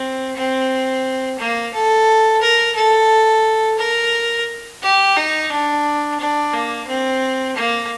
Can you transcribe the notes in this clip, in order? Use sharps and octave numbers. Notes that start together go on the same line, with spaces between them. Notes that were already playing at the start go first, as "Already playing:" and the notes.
Already playing: C4
C4
A#3
A4
A#4
A4
A#4
G4
D#4
D4
D4
A#3
C4
A#3